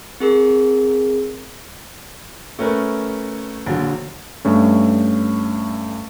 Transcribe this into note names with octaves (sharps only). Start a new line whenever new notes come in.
C4 G#4 A#4
A3 C#4 A#4 B4
A#1 D3 F#3
G2 A3 C#4